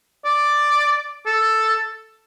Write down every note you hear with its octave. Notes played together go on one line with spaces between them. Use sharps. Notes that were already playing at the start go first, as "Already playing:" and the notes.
D5
A4